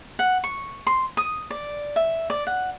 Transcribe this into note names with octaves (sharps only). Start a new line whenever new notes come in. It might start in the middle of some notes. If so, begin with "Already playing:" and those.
F#5
C#6
C6
D#6
D5
E5
D5
F#5